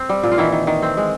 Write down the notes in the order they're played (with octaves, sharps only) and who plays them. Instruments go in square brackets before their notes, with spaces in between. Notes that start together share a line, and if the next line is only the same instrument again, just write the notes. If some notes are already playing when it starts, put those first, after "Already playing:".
Already playing: [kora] C4
G3
A#2
F4
D#3 E3 E4
D#3
D#3
C4
G#3